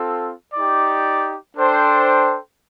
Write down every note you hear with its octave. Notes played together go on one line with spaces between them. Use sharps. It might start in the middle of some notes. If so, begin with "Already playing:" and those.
Already playing: C4 F4 A4
D#4 G4 D5
D4 A4 C5 G5